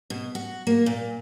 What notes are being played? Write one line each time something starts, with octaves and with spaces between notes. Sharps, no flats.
B2
F#4
A#3
A#2